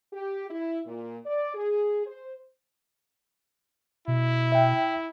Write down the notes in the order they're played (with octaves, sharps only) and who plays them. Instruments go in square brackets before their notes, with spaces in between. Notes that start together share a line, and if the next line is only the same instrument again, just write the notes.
[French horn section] G4
E4
A#2
D5
G#4
C5
[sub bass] B2 [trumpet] E4
[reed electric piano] E5 G5